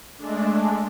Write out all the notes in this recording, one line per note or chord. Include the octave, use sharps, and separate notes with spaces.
G#3 A3 D4